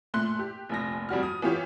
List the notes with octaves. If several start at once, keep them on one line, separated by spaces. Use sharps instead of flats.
A#2 A3 C6 F#6
G4
F1 A#1 A#6
F2 G3 F#4 F6
D#6
E3 B3 F4 G4 C#5